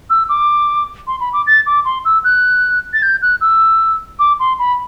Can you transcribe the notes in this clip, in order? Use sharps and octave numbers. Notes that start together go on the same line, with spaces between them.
E6
D6
C6
B5
D6
A6
D6
C6
E6
F#6
A6
G6
F#6
E6
D6
C6
B5